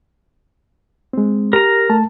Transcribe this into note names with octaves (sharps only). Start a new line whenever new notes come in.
G#3 C4
G4 A#4 A#5
A3 A5